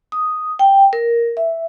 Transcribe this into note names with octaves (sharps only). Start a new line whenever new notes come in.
D#6
G5
A#4
E5